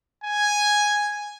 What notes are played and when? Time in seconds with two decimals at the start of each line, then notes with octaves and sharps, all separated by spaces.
0.24 G#5